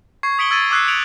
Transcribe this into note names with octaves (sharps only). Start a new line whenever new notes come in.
C#6 G#6 C7
D#6 B6 C#7 D7 F#7 G7
E6 G#6 A6 D#7
D6 E6 F#6 G#6 C7
C#7 D7 F7 F#7